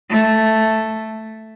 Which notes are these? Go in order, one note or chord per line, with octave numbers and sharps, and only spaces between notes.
A3